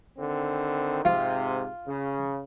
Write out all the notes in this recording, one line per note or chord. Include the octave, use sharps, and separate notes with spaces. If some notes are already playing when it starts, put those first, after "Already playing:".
D3 D#3 C4
G#2 C3 F4
C#3